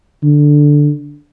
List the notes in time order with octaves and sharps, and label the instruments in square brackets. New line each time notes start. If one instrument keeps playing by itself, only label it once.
[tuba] D3